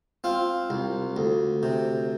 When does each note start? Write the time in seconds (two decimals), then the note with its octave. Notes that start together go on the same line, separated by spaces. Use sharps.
0.24 C4 F4
0.70 C2
1.16 D2
1.63 C3